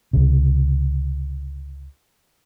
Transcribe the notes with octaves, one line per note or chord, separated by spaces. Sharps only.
C#2 C3